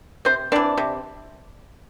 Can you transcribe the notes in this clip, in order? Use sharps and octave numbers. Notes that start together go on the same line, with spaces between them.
C3 C4 C5
E3 C4 D4 D5
C3